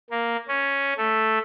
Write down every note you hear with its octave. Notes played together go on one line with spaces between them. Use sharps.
A#3
C#4
A3